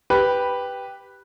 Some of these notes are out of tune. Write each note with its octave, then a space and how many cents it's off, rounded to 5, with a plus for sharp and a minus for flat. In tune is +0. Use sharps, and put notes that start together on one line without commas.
G4 +0 B4 +0